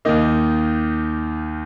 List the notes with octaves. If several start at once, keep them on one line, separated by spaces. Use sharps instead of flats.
D#2 D#3 A#3 D#4